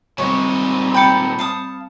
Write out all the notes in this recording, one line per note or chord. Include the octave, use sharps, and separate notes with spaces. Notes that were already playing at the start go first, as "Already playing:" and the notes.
A#2 G3 G#3 C4 D#4 C#5
G5 A5 B5 G6 C#7
F5 A5 D#6